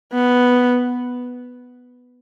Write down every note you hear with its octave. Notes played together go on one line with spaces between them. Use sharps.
B3